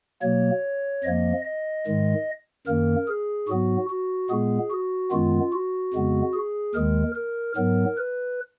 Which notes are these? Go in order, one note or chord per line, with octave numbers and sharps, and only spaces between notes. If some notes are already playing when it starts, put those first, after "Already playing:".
B2 F#3 A#3 C#5
F2 F3 A#3 D#5
D#5
G#2 D#3 G#3
F#2 D#3 A#3 A#4
G#4
G#2 F#3 B3 F#4
F#4
A#2 G#3 B3 G#4
F#4
F#2 D#3 G#3 B3 F4
F#4
F2 C#3 G#3 B3
G#4
D#2 D#3 G#3 A#4
A#4
G#2 F#3 B3 A#4
B4